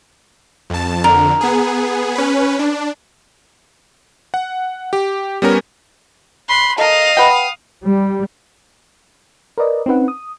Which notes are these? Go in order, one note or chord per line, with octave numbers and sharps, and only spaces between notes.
F2 A5
F2 D3 A#4
B3 G#4
C#4 B4
D4
F#5
G4
G3 B3 C#4 A#4
B5 C6
A4 A#4 D#5 F5 D#6
B4 F#5 G5
G3
A#4 B4 D5 D#5
C4 C#4 D#4 B4 F#5
D#6